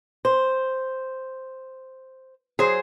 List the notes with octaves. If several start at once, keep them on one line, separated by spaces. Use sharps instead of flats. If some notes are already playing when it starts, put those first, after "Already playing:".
C5
F#3 G#4 C5